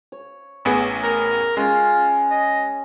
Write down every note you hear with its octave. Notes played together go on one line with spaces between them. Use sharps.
C#5
A1 B3 G#4
A#4
G#3 C#4 F4
D#5